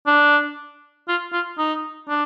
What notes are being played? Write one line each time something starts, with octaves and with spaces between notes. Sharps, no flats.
D4
F4
F4
D#4
D4